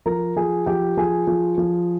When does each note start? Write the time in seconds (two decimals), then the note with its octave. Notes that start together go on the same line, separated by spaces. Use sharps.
0.06 F3 A#4 A#5
0.36 F3 G#4 G#5
0.66 F3 G4 G5
0.97 F3 G#4 G#5
1.27 F3
1.58 F3